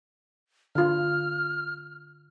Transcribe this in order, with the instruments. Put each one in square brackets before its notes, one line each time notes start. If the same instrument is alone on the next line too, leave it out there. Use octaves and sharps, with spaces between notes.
[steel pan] D3 F4 [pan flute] F6